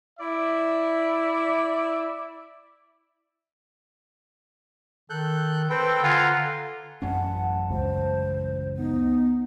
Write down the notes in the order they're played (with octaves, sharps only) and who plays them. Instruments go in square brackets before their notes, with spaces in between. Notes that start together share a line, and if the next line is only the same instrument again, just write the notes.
[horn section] E4 D5 E5
[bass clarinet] D#3 [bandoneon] A4 F#6 G6
[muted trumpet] C4 [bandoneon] A4 G5 [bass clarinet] B4
[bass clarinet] D3 [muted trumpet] F4 [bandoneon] F#5 G#5 A#5
[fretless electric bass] A1 F#2 C#4 [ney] F#5 [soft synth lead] A5
[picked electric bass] C#2 [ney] C5
[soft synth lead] B3 [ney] D#4